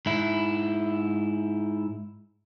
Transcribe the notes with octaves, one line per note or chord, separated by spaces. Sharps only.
G#2 E4